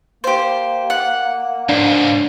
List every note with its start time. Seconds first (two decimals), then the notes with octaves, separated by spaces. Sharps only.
0.24 A#3 G4 C5
0.90 F#5
1.69 C#2 G#2 D4